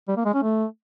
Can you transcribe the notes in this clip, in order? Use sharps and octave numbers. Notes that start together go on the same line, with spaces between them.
G3
A#3
G#3
C#4
A3